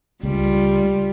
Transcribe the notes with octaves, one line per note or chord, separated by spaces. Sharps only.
C#2 G3 F4